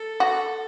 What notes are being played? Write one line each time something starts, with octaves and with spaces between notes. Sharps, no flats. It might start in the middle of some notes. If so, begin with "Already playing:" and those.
Already playing: A4
F#4